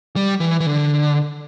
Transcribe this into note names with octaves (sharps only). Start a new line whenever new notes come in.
G3
E3
E3
D3